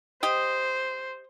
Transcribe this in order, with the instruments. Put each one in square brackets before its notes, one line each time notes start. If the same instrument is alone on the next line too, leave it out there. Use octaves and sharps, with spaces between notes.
[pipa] G4 D#5 [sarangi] C5